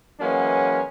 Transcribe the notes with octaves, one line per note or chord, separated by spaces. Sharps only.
E3 F#3 G#3 A#3 B3 C#4